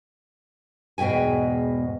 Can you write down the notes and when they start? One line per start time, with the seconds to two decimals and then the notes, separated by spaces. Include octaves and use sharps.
0.98 E2 G#2 B2 G5 G#5